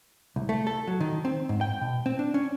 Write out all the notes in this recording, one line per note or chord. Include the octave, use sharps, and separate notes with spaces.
C2
A3
A4
F#3
D#3
C4
G#2
G5
B2
C4
D4
C#4